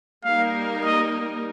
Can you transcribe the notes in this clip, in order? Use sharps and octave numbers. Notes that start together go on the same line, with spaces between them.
G3 A#3 D#4 A#4 F5
D#5